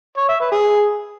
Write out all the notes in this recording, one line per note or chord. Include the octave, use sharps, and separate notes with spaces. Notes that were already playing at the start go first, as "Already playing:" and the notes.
C#5
E5
B4
G#4